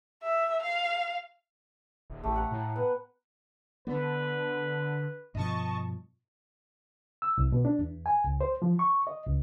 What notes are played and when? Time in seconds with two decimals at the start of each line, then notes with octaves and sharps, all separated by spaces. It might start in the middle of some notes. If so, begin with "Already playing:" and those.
0.23 E5
0.62 F5
2.10 D#1
2.23 A1 A3 G4
2.36 F#5 A#5
2.51 A2
2.76 B3
3.87 D3 B3 B4
5.35 G2 B2 F3 D#5 A5 C#6
7.22 E6
7.38 C2
7.52 B2
7.65 D4
7.79 E2
8.06 G#5
8.24 C#2
8.41 C5
8.62 F3
8.79 C#6
9.07 D#5
9.27 C#2